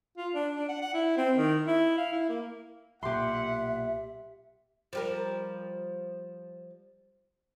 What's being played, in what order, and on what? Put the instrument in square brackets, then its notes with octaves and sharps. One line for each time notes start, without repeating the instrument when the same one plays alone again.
[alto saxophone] F4
D4
D4
F#5
F#5
E4
C4
D#3
E4
F5
E4
A#3
[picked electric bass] B1 A#2 [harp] G4 C6 [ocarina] E5 [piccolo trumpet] F#5
[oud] F3 G3 A#4